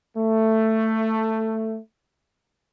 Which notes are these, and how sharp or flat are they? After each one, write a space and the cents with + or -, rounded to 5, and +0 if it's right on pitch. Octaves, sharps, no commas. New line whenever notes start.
A3 +10